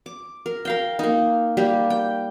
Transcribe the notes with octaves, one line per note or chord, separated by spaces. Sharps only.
D6
A#4
A#4 F5 G5
A#3 D#4
G3 A#3 G4
G5